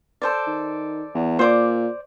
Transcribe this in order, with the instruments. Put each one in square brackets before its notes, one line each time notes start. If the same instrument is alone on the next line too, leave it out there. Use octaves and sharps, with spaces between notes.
[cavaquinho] A4 C5 D5
[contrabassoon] D#3
E2
[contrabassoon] A#2 [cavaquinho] C5 D5 D6